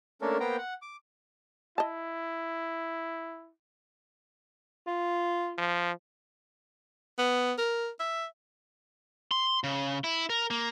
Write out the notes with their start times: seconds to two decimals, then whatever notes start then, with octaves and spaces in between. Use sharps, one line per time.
0.22 A3 A#3 C#4 D4 A4 A#4
0.40 A#3 B3 C5 G5 A#5
0.58 F#5
0.82 D6
1.78 E4 D#5 A5
4.87 F4
5.58 F3
7.18 B3
7.58 A#4
8.00 E5
9.31 C6
9.64 C#3
10.04 E4
10.30 A#4
10.50 A#3